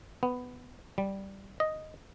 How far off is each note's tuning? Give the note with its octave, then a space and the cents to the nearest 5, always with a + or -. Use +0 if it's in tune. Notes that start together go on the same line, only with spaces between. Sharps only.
B3 +10
G3 -5
D#5 +0